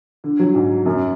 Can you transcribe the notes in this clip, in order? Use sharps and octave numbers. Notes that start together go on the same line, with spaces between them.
D3
F#3
G#2
F#2